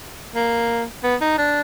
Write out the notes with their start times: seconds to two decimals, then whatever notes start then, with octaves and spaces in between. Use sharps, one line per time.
0.35 A#3
1.03 B3
1.21 D#4
1.38 D4